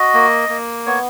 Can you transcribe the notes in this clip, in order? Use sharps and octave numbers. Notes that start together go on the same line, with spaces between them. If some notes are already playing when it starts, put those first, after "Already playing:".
Already playing: F#4 D#5
A#3
A#3
B3 C#5